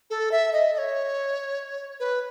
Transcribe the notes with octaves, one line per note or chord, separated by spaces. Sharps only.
A4
E5
D#5
D#5
C#5
B4